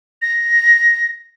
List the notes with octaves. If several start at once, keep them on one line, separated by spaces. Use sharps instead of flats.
A#6